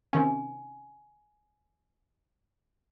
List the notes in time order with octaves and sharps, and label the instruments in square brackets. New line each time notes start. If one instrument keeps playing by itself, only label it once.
[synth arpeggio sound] C3 D#3 C#4 [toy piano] G#5